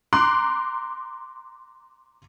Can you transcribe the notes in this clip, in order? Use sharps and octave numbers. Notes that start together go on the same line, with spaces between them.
A#5 C6 D6 F#6